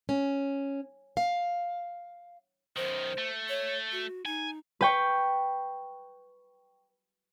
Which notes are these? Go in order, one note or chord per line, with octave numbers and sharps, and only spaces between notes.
C#4
F5
F#2 D#3 C5
A3
C#5
F#4
D#4 G#5
B4 G5 C#6